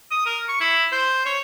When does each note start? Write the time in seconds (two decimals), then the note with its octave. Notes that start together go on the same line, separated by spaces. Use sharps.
0.11 D#6
0.26 A#4
0.48 C#6
0.61 E4
0.92 C5
1.26 C#5